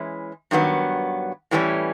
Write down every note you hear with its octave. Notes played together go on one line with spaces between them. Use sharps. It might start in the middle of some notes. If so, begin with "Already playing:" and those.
Already playing: E3 G#3 C#4 E4
G2 D#3 F#3 B3
A2 E3 G3 A#3 C#4